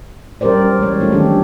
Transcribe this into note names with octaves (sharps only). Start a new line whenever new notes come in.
G3 C#4 G4 A#4 C5 D5
E3 G#3 C#5
A3 C#4 D#4 F4 A4
D#3 F#3 C4 D4 G4 A4